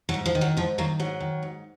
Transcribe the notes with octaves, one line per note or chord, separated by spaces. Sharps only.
F#3
G#2
F3
D#3
F#3
G#2 F3
D#3 F#3 A#3
G#2 F#3
D#3
G#2